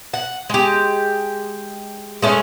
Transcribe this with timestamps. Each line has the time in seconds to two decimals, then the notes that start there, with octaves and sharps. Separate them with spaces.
0.14 F#5
0.50 G#3 G4
2.22 G#3 A3 C#4